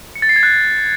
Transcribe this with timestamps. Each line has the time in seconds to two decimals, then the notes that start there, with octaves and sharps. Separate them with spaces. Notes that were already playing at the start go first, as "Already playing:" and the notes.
0.15 C#7
0.22 A6
0.29 C7
0.36 G#6
0.43 F#6